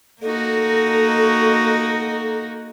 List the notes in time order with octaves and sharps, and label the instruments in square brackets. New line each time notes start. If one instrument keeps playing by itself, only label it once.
[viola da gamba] A#3 D#4 F#4 [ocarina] A4